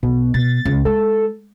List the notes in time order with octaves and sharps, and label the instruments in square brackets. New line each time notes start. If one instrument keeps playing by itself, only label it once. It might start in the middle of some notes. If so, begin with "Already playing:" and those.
[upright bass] B1 [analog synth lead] B2
[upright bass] B2 [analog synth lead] A6
[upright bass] C#2
[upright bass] G#3 [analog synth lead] A4